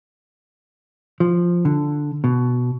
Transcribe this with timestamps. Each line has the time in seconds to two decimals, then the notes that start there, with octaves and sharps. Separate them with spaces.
1.20 F3
1.65 D3
2.24 B2